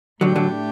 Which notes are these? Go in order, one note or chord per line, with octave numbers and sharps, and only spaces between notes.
A2 D3 F#3 A3 D4 G4
D3 F#3